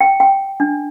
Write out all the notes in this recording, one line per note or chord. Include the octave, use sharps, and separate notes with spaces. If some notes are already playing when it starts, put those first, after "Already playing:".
G5
G5
D4